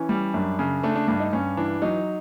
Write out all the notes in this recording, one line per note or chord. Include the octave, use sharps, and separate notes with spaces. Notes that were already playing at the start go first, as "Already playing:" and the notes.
Already playing: E3 C#4
G3
F#2 D4
C#3
A3 D4
D4
G2 D4
D#4
G2 C#4
E3 D4
F#3 D#4